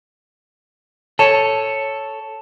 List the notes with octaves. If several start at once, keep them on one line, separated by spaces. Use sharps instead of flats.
A4 C#5 A5 E7